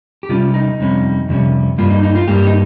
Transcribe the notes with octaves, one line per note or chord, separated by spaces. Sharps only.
G4
C3 G3 C#4 F4
D#4
F2 C3 G3 C#4
F2 C3 G3 C#4
G2 G3 A#3 F4
D#4
D#4
F4
G2 G3 A#3 G4
D#4